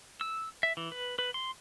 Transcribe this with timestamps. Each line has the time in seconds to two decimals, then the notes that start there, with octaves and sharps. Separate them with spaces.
0.21 E6
0.63 E5
0.77 E3
0.92 B4
1.19 B4
1.34 C6